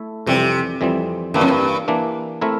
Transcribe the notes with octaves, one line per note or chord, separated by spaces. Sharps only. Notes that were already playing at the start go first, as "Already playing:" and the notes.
Already playing: A3 E4 A4 E5
F2 C3 E3 G3 C4
F2 E3 G3 C4
G2 E3 A#3 D4
F2
G2
E3 A#3 D4
A3 C4 E4 A#4 E5